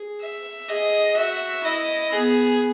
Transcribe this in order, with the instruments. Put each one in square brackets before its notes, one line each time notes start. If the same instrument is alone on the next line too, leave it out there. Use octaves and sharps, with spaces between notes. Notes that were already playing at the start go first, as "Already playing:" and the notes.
Already playing: [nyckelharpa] G#4
[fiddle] E5
[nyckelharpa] G#4 [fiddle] D#5
[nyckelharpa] F#4 [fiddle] E5
[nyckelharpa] E4 [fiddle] D#5
[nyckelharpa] B3 [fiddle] G#4